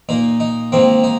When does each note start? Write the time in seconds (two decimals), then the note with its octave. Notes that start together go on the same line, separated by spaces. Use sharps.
0.09 A#2 A#3 D#4
0.40 D#4
0.72 G#2 D#3 A#3 C4
1.04 D#4